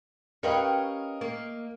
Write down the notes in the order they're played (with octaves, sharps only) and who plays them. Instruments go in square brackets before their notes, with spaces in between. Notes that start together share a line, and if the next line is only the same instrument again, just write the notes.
[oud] C#4 G4 B4 [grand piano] A#4 D#5 F5
[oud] A#3